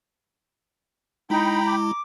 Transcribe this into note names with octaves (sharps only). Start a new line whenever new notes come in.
G#3 D#4 E4 G5 A#5 B5
D6